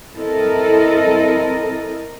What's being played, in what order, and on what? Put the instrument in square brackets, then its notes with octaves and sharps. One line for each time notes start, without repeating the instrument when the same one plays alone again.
[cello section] C4 E4 A4 A#4 D#5